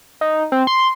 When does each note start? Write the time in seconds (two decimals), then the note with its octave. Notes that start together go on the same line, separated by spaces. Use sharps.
0.21 D#4
0.52 C4
0.67 C6